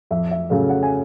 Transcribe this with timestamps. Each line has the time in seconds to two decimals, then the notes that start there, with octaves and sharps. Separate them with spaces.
0.11 F2 E5
0.31 E5
0.50 C#3 F#3 A3 F5
0.69 F#5
0.83 G#5